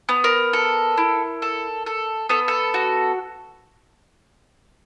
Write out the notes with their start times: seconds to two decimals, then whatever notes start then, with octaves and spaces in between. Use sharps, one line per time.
0.09 B3
0.24 A#4
0.53 A4
0.98 E4
1.42 A4
1.86 A4
2.29 B3 A4
2.48 A4
2.74 F#4